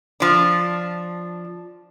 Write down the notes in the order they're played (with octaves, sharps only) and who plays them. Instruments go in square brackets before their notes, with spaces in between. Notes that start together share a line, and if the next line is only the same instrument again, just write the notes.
[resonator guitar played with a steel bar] F3 D4